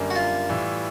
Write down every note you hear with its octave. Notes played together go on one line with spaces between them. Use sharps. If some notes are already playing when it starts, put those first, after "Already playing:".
Already playing: F#2 D3 G3 A#3
F#4
F4
A2 E3 G3